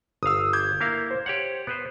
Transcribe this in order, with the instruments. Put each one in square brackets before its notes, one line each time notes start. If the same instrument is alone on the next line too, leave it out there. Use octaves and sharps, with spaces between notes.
[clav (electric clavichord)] G1 F5 [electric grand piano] D#6 E6
[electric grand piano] D6 G6 G#6
[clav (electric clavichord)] A#3 E4 F5
[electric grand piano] C5
[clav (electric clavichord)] G4 C#5 F#5
B3 B4 C5